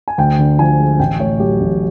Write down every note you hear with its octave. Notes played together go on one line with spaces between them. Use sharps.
G#5
D2 G5
D3
F3 G#5
G#3
A1 G5
A2 C#5
F#3 G4
A1